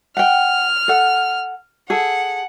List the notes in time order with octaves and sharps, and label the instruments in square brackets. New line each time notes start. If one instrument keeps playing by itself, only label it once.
[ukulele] F#5 G5 [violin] F6
[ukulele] A4 F#5
[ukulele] G#4 A4 [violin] F#5